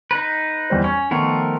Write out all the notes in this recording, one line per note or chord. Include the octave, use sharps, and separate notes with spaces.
D#4 B4
E2 G3 C5
C#4 C#6
D#3 F3 A3 B3 A#4 C#6